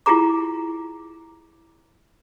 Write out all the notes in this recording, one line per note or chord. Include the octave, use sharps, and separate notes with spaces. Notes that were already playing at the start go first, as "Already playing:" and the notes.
E4 F4 G4 G#4 A#5 D6